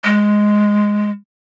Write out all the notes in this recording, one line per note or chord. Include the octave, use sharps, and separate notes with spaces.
G#3